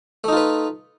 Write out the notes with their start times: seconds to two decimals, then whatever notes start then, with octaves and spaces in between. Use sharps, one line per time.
0.24 A3
0.28 D#4
0.33 F4
0.37 B4